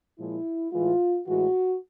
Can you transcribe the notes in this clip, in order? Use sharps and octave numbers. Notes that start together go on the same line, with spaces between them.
A#2 F3 G#3 E4
A2 E3 G#3 F4
A2 E3 G#3 F#4